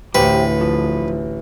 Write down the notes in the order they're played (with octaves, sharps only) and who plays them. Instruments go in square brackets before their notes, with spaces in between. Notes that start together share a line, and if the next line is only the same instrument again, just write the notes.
[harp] A1 [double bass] D2 [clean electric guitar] G4 C5 [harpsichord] B4
[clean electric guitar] F3